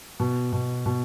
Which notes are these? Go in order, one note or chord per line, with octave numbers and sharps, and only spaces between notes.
B2
B2
B2